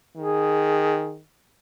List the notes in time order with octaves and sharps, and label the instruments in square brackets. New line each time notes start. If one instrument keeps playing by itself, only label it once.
[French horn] D#3 [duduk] G#4